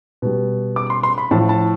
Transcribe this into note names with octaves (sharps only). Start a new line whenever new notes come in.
B2 G3
D6
C6
C6
B5
A2 F3 A5
A5